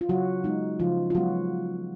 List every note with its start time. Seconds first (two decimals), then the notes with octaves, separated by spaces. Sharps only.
0.01 F4
0.09 C#3 F#3 F#4
0.44 G#3 B3 D#4
0.79 C#3 F3 F4
1.10 F4
1.15 F#3 G#3 B3 F#4